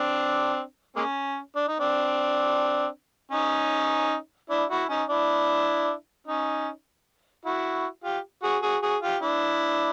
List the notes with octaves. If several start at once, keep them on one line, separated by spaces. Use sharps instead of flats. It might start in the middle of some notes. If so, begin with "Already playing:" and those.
Already playing: C4 D4
G#3 A#3 C#4
D4
D#4
C4 D4
C#4 D#4
D4 E4
E4 F#4
C#4 D#4
D4 E4
C#4 D#4
E4 F#4
F4 G4
F#4 G#4
F#4 G#4
F#4 G#4
F4 G4
D4 E4